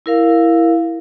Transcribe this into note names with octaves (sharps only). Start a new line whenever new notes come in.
E4 A#4 F5